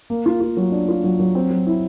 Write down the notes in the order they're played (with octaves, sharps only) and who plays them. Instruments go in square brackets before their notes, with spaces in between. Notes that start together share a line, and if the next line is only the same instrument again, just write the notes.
[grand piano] A#3
F4
F4
F#3
D4
F4
F#3
F#3
C4
F#3
E4